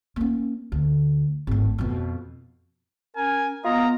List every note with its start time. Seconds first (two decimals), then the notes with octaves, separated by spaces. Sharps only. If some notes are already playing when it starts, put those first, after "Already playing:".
0.16 A#3 C#4
0.72 D2
1.47 G#1 A2
1.78 F2 B2
3.16 C#4 A#4 G#5
3.64 B3 F4 D#5 A#5